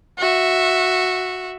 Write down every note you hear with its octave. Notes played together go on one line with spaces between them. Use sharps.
F#4 E5